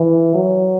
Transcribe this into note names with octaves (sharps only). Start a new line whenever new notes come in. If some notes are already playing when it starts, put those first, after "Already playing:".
Already playing: E3
F#3